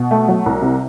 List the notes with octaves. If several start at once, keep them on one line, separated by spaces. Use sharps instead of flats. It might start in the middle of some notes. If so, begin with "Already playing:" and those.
Already playing: B2
A3
F#3
C2
C3